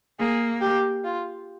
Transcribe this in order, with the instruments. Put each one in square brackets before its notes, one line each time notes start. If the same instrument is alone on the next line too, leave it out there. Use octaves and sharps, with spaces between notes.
[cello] A#3 [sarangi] G#4
[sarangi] G4
F4